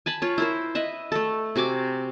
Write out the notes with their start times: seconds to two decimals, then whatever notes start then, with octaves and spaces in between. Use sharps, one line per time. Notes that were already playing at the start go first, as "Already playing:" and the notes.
0.06 G#5 A5 B5
0.22 F4 C#5
0.38 E4 A#4 C5
0.75 B4 D#5 E5
1.12 A3 A4
1.56 C3 F#4 G#5 D6